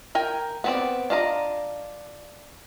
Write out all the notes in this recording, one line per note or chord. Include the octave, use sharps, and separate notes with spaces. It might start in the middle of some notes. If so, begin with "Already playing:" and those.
A#4 G5 G#5
B3 C4 D5
D4 F4 D#5 A#5